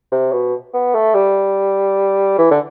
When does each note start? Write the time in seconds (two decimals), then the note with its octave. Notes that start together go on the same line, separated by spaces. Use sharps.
0.12 C3
0.32 B2
0.73 B3
0.94 A3
1.14 G3
2.38 E3
2.51 D3